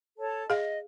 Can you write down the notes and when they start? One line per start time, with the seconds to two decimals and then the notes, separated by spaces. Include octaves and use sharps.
0.17 A4 C#5 A5
0.50 G#4 D#5 F5